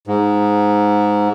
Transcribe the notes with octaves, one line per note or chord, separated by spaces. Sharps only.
G#2